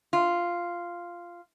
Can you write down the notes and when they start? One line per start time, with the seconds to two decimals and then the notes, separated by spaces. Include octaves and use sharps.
0.13 F4